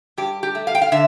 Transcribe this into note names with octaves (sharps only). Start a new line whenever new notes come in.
G2 G4
G4
A3
F5
G5
F5
D3 E5